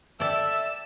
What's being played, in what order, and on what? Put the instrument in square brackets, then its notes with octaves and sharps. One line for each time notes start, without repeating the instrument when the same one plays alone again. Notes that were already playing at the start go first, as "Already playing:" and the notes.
[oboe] A4 [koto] D5 G5 [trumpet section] E5 [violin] E6